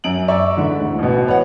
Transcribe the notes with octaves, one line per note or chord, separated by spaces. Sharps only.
F#2 D7 F#7
D5 E5 A#5 C#6
G#2 D3 E3
D2
A1 B2
B4 C#5 D#5 F#5